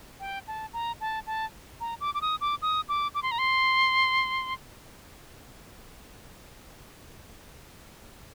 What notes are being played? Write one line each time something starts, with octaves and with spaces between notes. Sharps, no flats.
G5
A5
A#5
A5
A5
A#5
D6
D6
D#6
D6
D#6
D6
D6
C6
A#5
C6